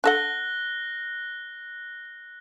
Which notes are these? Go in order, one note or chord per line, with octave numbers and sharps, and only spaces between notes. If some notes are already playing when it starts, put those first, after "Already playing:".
D4 A4 F#5 F#6 A#6 G7